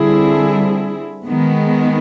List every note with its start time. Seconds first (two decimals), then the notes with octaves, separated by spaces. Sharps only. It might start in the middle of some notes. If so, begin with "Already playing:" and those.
Already playing: D3 G3 C4 E4 G#4
1.26 D#3 G#3 B3